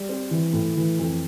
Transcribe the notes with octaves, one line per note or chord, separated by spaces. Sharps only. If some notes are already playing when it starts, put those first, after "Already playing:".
Already playing: G3
C4
E3
A2
E3
F2